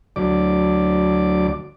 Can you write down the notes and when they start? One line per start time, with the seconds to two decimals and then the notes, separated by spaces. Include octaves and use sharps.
0.16 D2 F#3 D5 D6